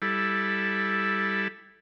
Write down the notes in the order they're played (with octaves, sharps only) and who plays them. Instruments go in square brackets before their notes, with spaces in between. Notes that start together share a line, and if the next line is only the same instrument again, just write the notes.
[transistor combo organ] G3 E4 A4